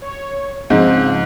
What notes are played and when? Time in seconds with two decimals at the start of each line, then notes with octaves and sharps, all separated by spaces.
0.02 C#5
0.70 G#2 C#3 F3 C4